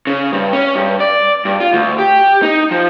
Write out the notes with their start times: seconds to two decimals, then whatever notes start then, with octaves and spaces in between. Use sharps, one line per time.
0.07 C#3
0.32 G2
0.53 C#4
0.75 G2
1.00 D5
1.45 G2
1.60 F4
1.73 D2
1.98 G4
2.42 D#4
2.71 F3